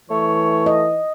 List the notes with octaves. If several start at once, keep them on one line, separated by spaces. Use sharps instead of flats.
E3 A3 C#5
D#5